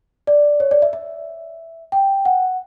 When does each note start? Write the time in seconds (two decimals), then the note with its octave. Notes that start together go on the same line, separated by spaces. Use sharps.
0.27 D5
0.60 C#5
0.71 D5
0.82 E5
0.93 E5
1.92 G5
2.25 F#5